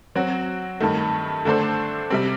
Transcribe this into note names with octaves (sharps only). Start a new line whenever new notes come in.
F#3 C4 F#4
G2 D#3 A3
D3 A3 D4 A4 C5
C3 G3 C4